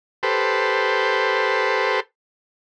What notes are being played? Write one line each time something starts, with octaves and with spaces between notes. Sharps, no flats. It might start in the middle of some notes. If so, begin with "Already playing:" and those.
G4 A4 B4 C5